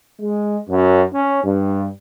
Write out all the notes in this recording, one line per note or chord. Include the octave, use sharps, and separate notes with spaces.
G#3
F#2
C#4
G2